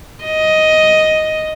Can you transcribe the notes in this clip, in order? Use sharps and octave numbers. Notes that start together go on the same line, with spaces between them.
D#5